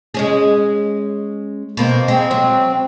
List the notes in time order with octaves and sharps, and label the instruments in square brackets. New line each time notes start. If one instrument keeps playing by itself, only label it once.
[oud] G#3 C#4 G#4
B2 A#3 C4
[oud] G#3 [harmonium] C4
[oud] F#3